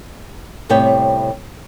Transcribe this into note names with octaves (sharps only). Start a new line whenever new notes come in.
A2 C3 G3 B3 C#5 G5